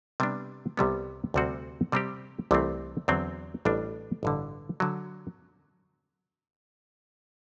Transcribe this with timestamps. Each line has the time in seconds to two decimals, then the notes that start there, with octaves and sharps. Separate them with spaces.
0.20 C3 G3 B3 D4
0.77 C2 C3 G3 B3
1.34 D2 C3 G3 C4 F#4
1.92 C3 G3 C4 G4
2.51 C2 C3 E3 A3 C4
3.08 E2 D3 F#3 C4
3.65 A1 A2 G3 D4
4.23 A1 G2 D3
4.80 D3 F#3